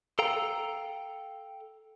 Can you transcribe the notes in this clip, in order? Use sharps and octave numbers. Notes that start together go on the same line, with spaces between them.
A4 F5 G5 A#5